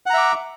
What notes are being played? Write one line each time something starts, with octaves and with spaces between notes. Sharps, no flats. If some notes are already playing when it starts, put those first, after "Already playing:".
E5 F#5 A#5 D6